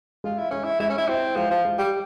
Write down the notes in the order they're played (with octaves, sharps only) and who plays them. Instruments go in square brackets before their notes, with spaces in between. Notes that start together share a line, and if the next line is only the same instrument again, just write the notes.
[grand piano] G#3 [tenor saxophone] F4
[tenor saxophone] E4
[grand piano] G#3 [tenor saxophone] C#4
[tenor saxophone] E4
[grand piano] G#3 [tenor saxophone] E4
[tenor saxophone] C#4
E4
[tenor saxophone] C4 [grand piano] E4
[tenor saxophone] F3 [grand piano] G#3
[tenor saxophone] F3
[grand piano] G#3
[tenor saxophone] G3